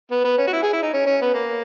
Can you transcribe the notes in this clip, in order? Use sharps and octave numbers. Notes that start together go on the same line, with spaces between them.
B3
B3
C#4
F#4
E4
G#4
E4
D#4
C#4
C#4
B3
A#3